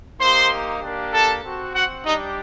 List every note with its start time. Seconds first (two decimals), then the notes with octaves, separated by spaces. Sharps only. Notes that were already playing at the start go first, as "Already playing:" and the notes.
0.20 A#3 D#4 G4 C5 C6
0.81 A#3 D4 G4
1.12 A4 A5
1.43 C4 F#4
1.74 F#4 F#5
2.04 G3 D4 D#4 G4 D#5